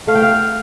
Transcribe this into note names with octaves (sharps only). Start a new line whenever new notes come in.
A3 F5
G5
F5